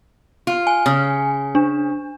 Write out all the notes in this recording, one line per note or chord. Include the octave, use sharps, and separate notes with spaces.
F4
G#5
C#3
D4